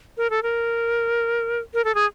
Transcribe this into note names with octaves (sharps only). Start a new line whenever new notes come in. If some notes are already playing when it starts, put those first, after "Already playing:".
A#4
A4
A#4
A#4
A4
G#4